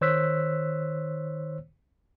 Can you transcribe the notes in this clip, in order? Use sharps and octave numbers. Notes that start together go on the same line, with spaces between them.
D#3 C5 C#5 E6 F#6 B6